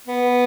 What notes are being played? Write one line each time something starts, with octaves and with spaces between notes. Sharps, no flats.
B3